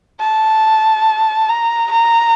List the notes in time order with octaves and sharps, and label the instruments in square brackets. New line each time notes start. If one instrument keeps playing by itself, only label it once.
[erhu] A5
A#5
A#5